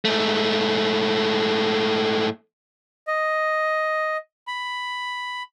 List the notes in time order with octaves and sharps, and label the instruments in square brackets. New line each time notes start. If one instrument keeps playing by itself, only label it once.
[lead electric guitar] G#2 A3
[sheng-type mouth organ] D#5
B5